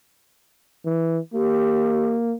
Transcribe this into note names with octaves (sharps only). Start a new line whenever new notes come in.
E3
A#3 G4